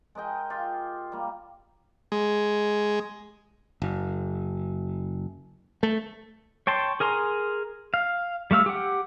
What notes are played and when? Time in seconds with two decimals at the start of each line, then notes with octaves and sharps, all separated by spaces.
0.15 G#3 A#4 D#5 G5
0.50 F4 G4 G5
1.12 G3 A#3
2.12 G#3
3.82 F#1
5.83 A3
6.67 C#5 G5 A5 C6
7.00 G#4 A#4 G#5 A#5 C6
7.94 F5
8.51 G3 A3 F5 E6
8.66 G4 F#5